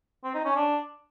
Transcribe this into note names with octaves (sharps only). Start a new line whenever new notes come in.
C4
D#4
C#4
D4